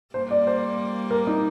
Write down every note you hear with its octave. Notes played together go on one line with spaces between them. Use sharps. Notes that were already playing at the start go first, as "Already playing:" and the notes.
G3 A#3 C5
D5
C5
A#4
D#4